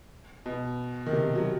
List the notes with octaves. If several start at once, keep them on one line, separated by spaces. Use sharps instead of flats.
B2
D#3
C3
F#3